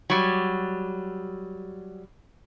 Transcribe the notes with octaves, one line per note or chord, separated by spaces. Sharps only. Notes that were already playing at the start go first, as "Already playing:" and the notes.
F#3 G3